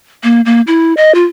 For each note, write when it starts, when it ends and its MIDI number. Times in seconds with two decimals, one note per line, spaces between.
0.24 0.41 58
0.46 0.61 58
0.67 0.93 64
0.97 1.14 75
1.15 1.24 65